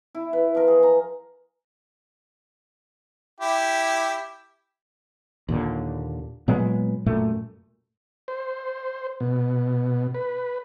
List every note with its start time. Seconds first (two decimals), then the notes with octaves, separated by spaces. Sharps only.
0.15 E4
0.33 B4
0.55 F3 A#4
0.68 G#4
0.83 A#5
3.41 E4 G4
5.49 D#2 A#2 D3
6.48 A#2 F#3 G#3 B3
7.06 F#2 A#2 A3
8.28 C5
9.20 B2
10.14 B4